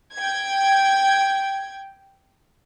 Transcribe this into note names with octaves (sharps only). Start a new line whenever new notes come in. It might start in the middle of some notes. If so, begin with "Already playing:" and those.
G5 G#6